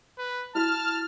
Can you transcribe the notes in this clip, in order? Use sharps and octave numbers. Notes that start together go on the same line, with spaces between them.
B4
E4 F#4 A5 F6